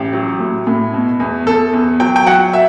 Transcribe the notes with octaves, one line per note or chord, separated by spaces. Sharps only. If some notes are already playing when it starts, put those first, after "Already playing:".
Already playing: A1 G4
F#3
A2
A2
B2
E2
E2 A4
E2
F#3 G5
G5
F#3 F#5
E5